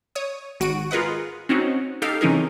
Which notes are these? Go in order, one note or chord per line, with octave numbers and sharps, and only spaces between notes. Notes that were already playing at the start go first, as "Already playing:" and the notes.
C#5 D#6
G#1 F#4 D7 D#7
F4 G#4 A#4 B4 D#5 F#5
C4 C#4 D#4 F#4
D#4 G4 A4 F5 G5
C3 E3 C#4 D#4 G#4 A#4